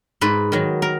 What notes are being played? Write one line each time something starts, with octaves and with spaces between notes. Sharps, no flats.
G#2 B4
D#3 F#3
A#4